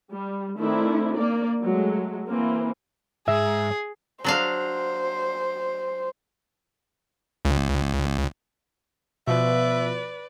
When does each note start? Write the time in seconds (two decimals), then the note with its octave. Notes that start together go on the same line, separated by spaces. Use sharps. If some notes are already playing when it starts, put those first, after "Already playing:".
0.13 G3
0.58 D#3 A3 C4 D4 E4
1.16 A#3 D5
1.62 F#3 G#3 A3
2.28 E3 A#3 C4
3.28 G#2 G#4 E5
4.24 F#3 D4 C5 F5
7.45 C#2
9.27 B2 F3 B4 D5 E5